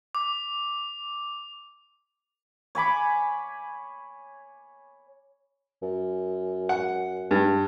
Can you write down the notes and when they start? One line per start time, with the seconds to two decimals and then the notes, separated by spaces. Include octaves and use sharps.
0.15 D6
2.75 C#5 G#5 B5 D6
5.82 F#2
6.69 F#5
7.31 G2